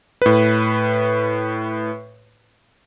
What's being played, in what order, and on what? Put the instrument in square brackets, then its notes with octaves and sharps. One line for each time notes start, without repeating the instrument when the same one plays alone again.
[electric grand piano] A2 B4